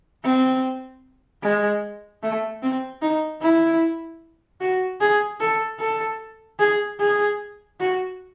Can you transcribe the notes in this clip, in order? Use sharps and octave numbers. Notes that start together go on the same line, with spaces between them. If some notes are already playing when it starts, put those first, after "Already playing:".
C4
G#3
A3
C4
D#4
E4
F#4
G#4
A4
A4
G#4
G#4
F#4